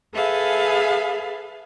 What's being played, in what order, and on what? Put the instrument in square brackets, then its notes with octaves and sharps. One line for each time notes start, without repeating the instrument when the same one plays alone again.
[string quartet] G#4 A4 B4 E5 F5